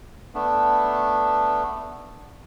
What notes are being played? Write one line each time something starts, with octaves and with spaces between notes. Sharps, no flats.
A3 B3 D4